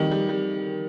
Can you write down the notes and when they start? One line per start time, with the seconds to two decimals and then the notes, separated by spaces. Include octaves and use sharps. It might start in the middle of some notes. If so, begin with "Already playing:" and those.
Already playing: D#3 G3
0.11 G3
0.29 G3